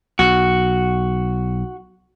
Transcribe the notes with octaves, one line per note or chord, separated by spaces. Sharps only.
B1 F#4